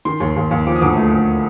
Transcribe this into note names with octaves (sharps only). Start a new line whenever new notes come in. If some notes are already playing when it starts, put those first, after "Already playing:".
D#3 C6
D#2
D#2
D#2
F3 D6
D#6
D2 D6
A3
D2